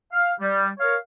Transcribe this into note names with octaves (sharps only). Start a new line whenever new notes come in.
F5
G3
A#4 C#5 F5